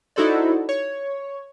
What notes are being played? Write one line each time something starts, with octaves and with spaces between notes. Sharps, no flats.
D#4 E4 F#4 A4 C5 D5
C#5